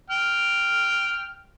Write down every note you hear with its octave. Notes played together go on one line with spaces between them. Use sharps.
G5 F6